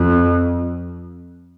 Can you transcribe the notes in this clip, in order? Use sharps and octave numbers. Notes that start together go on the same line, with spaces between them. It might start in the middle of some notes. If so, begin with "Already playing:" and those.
Already playing: F2